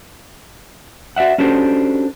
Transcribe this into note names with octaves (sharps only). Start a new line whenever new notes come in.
F#4 D5 E5 F#5
C#4 D4 F#4 G4 A4 C5